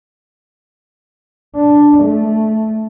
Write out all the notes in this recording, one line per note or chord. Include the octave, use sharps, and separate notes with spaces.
D4
A3